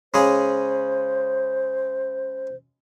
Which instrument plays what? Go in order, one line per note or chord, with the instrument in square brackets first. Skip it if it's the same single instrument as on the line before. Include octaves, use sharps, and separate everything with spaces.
[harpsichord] C#3 G#3 G#4 [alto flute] C5